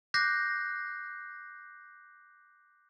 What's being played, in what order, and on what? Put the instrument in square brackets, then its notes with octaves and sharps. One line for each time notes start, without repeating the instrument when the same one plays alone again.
[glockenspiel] D6 F#6 G6 A#6 C7